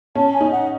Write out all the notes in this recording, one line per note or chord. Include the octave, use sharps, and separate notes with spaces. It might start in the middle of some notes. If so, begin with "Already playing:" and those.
C#4 A5
G#5
D#4
F#5